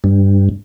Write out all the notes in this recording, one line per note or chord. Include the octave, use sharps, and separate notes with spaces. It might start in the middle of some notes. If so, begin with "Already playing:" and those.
G2